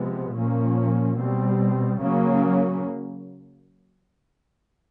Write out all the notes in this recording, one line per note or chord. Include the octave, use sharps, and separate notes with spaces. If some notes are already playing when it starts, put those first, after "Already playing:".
Already playing: C3 F3 G#3 B3
A#2 F3 A#3 C#4
B2 G3 C4
C#3 F#3 A#3 C#4